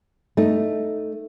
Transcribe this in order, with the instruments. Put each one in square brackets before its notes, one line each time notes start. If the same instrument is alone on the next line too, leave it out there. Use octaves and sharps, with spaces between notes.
[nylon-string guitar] A3 D#4